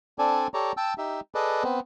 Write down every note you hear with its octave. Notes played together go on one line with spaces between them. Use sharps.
C4 D4 A4 D5 G#5
G4 A4 C#5 D5 A#5
G5 A5 E6
D#4 G4 E5
G#4 A4 B4 D5 D#5
B3 C4